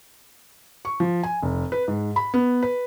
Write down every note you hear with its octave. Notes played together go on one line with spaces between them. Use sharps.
C#6
F3
G#5
F1
B4
G#2
B5
B3
B4